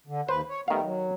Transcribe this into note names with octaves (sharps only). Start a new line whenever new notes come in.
D3
D#2 B4 C5
C#5
D#3 G3 A3 B3 F5
F#3